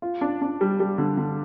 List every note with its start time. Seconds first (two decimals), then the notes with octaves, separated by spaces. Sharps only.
0.02 F4
0.21 D4
0.42 D4
0.61 G3
0.80 G3
0.98 D3
1.17 D3